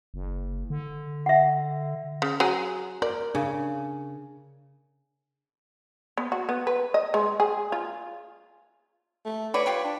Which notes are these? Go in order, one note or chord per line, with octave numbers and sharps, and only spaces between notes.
F#1
D3
E5 F#5
C#3
F#3 G#4
A#4 D5
C#3 D4
B3
F#4
B3
B4
D#5
G#3
G#4
F4
A3
F#4 B4 C#5 D5
F4 G4 B4
D4